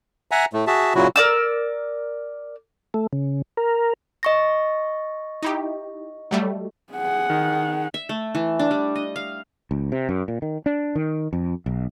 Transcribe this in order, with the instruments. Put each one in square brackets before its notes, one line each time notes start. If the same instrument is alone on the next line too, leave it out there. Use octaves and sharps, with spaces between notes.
[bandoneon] E5 F#5 G#5 A#5
A2 A3
F#4 G#4 E5 A5
A#2 C#3 F#3 E4 F#4
[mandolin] A#4 D5 E6
[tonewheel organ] A3
C#3
A#4
[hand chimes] D#5 C#6 A#6
[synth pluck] D#4 E4 G4
F#3 G3 A3
[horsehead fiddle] G#4 F#5
[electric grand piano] D#3
[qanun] E5
A3
E3
D4
G3
D#5
F5
[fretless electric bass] C#2
C3
F#2
A#2
D#3
D4
D#3
F2
B1